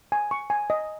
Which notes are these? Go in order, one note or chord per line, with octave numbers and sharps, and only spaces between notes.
G#5
C#6
G#5
D#5